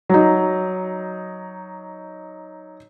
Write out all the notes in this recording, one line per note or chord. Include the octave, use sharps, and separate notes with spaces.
F#3 D#4